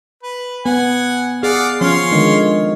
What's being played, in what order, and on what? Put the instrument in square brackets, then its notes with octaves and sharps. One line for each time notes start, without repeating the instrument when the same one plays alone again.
[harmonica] B4
[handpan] B3 [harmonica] F#5 G#5
[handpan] G#4 [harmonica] D5 F5 F#5
[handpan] F3 C#4 [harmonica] C#5 F5 C6
[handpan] D3 D#3 G#3